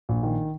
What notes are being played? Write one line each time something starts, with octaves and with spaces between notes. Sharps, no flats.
A#1
D#3